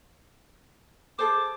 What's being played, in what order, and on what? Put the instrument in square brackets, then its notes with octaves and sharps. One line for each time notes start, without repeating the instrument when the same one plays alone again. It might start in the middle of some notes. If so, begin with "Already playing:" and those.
[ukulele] G#4 A4 C5 [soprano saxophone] D6